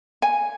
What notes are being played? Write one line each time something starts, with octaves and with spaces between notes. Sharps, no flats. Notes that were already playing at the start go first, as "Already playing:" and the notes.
G#5